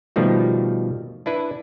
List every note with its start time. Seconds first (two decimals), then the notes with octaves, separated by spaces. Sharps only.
0.16 B2 D#3 F3 G3 A3
1.26 D4 E4 B4